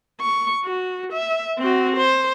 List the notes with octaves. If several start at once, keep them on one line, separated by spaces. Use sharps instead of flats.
C#6
F#4
E5
C4 F#4
C5